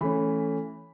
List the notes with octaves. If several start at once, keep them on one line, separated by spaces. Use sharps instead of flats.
E3 A3 C#4 B5